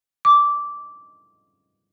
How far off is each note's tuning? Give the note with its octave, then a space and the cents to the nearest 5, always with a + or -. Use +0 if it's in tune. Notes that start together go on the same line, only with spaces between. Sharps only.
D6 -10